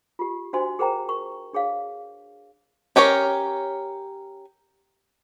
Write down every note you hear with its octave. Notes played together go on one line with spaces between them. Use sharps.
F4 G4
D4 F#4 C5 D#5 G#5 C6
G#4 A#4 C5 G5 A#5
A#4 C#6
D4 G#4 C#5 F5
C#4 G4 A#4 C#5